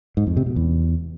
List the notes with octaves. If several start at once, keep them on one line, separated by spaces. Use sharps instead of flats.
G#2
F2
C3
B2
E2